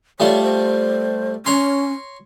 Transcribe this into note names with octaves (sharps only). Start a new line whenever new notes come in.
G3 A3 F4 C#5
C5
C#4 C#5 A#5 C6